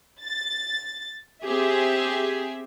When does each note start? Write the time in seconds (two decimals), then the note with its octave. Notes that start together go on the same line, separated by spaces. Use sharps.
0.23 A6
1.44 C4 G4 G#4 E5